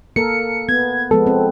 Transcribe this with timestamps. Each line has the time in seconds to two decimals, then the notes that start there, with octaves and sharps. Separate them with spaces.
0.16 A#3 A4 A#4 C#7
0.69 B3 G#6
1.11 F3 G#3 B3 A4
1.27 C4